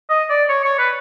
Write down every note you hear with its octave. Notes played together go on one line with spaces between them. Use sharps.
D#5
D5
C#5
C#5
B4